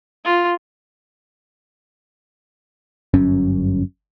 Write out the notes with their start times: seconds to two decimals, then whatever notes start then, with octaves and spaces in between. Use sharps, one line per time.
0.25 F4
3.14 G1 F#2 C#4